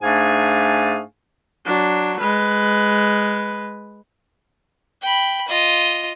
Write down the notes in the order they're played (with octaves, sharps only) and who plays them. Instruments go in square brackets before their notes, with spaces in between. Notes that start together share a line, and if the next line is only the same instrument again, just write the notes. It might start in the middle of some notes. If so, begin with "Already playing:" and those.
[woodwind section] G#2 A3 D4 G#4 F5 G#5
[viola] F#3 D4
G#3 B4
[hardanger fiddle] G5 B5
F4 D#5